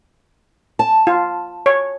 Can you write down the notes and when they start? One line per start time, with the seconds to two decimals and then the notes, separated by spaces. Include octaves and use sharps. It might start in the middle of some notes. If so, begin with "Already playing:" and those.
0.79 A5
1.07 F4
1.66 C#5